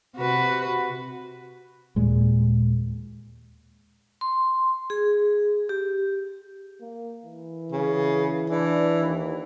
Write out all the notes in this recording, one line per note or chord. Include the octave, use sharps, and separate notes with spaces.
C3 F#4 B4
D#2 A#2 G#3
C6
G#4
G4
A#3
E3
C#3
E3 D4
D#2